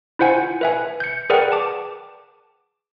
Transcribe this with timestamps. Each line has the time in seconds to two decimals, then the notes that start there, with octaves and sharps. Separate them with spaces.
0.19 E4 F4 C5 F#5 G#5
0.61 B4 E5 G#5
1.00 G6 C#7
1.30 G#4 A#4 B4 D5 F#5 G5
1.52 A5 D6